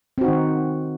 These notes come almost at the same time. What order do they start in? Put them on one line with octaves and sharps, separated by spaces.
C4 F#4 D#4 D#3